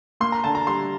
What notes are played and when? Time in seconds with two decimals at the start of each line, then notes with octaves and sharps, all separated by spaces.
0.20 A#3 C6
0.32 A#5
0.44 D3 A5
0.55 A#5
0.67 G3 C6